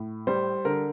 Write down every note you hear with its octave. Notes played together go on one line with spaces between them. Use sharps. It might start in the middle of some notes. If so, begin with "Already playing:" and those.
Already playing: A2
G3 C5
D3 A#4